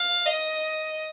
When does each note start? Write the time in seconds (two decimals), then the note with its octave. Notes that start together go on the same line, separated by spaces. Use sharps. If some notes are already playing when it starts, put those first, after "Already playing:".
Already playing: F5
0.27 D#5